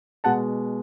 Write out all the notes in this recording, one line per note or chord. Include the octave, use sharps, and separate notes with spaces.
B2 G#3 F#5 A5